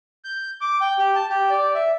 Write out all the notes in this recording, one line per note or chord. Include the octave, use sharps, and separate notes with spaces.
G6
D6
G5
G4
A5
G4
D5
E5